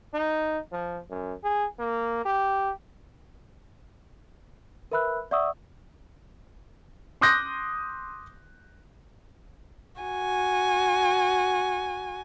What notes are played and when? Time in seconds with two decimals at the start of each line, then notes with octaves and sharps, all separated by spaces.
0.14 D#4
0.72 F3
1.10 F#2
1.44 G#4
1.79 A#3
2.25 G4
4.92 A#4 B4 E5 B5 E6 F#6
5.31 D5 E5 F#5 C#6 D#6 E6
7.21 C6 D6 D#6 F#6 G6 A#6
10.01 F#4 G#5